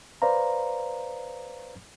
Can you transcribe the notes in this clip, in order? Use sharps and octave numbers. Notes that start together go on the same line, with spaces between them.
B4 C5 D5 F5 A#5